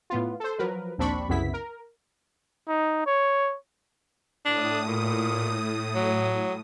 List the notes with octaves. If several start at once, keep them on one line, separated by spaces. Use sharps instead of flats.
A2 B3 F4
A4 C5
F3 F#3 A#4 B4
A#1 D#2 C4 D4 B5 C#6
C2 F#2 C#3 B3 E4 B6
A#4
D#4
C#5
A2 D4 D#6
A#2
F#3